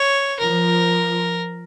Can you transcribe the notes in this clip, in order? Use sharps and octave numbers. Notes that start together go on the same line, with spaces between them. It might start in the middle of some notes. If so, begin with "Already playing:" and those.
Already playing: C#5
F3 A#4